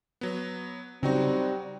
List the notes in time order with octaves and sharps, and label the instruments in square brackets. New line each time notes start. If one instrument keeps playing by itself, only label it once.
[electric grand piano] F#3 B3
[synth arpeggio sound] C#3 [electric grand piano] F#3 D#4 F#4 [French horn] G3 [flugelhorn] C4